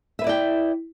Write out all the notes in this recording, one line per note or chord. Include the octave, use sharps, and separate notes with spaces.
E4 B4 D5 E5 G5